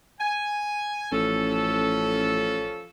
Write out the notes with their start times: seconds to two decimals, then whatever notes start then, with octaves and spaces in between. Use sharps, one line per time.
0.19 G#5
1.12 A1 F3 C#4 A4